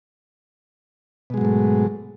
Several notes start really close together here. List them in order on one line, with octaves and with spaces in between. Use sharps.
B2 G#3 F#3 G#2 A3